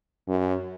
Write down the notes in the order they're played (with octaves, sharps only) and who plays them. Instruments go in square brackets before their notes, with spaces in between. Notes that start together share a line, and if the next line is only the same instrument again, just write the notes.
[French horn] F#2